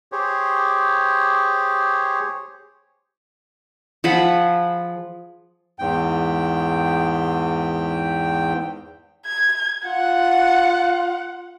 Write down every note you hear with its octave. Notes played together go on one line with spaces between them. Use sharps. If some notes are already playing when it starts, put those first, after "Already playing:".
G4 G#4 C5 C#5
F3 G#4 F#5 B5
E2 G#2 G5
G#6
F4 F#5